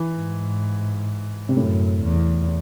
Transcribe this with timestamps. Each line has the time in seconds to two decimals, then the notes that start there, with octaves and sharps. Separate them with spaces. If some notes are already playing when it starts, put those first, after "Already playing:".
Already playing: E3
0.16 G#2
1.49 C3
1.56 F#2 A2
2.03 E2